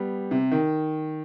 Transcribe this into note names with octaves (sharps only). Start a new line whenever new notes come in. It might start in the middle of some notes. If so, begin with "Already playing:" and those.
Already playing: G3 B3
C3
D#3